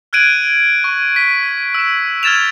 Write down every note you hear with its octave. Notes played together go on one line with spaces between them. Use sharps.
F6 F#6 G#6 D7 D#7 F#7
C#6
B6
E6 E7
F6 G#6 A6 E7 F7